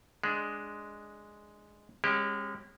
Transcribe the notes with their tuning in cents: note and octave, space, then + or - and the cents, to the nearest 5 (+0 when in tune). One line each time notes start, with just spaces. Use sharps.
G#3 +0 D4 +0
G#3 -30 C#4 -25 G4 -5